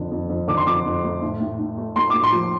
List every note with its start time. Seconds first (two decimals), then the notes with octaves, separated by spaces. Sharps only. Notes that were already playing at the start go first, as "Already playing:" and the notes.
Already playing: F2 D3
0.11 F2
0.29 F2
0.48 D3 D6
0.57 C6
0.67 F2 D6
0.86 F2
1.04 A3
1.22 A2
1.40 A2
1.59 A2
1.77 A3
1.96 A3 C6
2.10 A2 D6
2.23 C6
2.32 F3